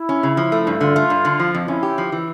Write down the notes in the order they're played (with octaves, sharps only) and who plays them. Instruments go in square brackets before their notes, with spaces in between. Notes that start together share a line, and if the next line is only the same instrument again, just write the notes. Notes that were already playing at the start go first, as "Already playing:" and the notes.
Already playing: [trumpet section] E4
[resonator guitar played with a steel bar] C#4
C#3
F3
A3
G2
[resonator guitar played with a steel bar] D3 [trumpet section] F4
[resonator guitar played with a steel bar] A3
G2
D3
F3
F2
[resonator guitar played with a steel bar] C#4 [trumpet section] E4
[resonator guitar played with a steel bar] G4
F3
E3